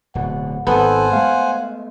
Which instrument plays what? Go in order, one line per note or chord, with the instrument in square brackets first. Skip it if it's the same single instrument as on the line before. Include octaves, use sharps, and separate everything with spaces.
[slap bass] D1 B2 [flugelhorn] F#5
[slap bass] G#1 D#3 [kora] B3 [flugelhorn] A4 [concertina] C5 F#5 G#5
[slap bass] G#3 A3 [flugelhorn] F5